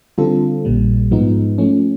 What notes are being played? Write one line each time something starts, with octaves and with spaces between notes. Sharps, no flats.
D3 G3 C4 F4 A4
A#1 A#2 G3
G#2 F3 G#3 B3 D#4
F3 A3 C#4